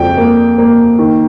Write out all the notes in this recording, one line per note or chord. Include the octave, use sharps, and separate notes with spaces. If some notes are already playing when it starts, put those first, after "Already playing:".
Already playing: F2 G5
A#3
A#3
D#3